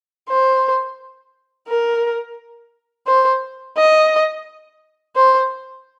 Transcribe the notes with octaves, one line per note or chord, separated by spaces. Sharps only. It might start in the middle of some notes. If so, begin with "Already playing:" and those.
C5
A#4
C5
D#5
C5